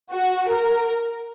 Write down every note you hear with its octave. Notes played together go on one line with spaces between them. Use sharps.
F#4
A#4